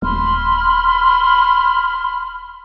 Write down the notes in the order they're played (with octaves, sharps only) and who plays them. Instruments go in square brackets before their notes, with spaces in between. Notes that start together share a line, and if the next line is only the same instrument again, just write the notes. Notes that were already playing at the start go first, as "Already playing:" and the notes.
[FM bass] D#1 [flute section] B5 C6 F6